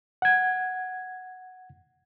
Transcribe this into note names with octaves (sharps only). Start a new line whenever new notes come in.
F#5 G#6